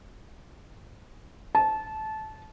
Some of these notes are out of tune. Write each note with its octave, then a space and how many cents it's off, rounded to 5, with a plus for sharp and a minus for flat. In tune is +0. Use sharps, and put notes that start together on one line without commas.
A5 -20